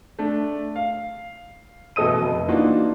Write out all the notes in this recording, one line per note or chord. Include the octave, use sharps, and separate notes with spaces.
A3 D4
F5
A1 B2 A4 D#5 D#6 D#7
F1
E3 A#3 D4 D#4 F4 F#4